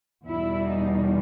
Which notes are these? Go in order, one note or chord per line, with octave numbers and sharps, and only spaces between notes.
E2 B2 G3 E4
D#4